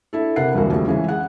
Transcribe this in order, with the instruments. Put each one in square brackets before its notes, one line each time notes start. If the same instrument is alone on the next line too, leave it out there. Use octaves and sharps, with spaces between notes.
[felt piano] D4 E4 A4
C3 E4 A#4 F#5 C7
E1 C2 D3 A#3 F#4
F2 D3 G3 A3
C#3 E3 G#3 C#4
G#4 F#5